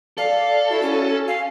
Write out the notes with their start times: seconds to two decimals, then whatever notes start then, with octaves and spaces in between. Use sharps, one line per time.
0.18 A4 D5 F5
0.70 E4 F#4
0.82 C#4
1.28 F5 G#5